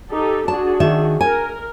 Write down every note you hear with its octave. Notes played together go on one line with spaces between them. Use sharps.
D#4 G4 A4
D4 F#4 G#4 A5
D#3 E5
A#4 G#5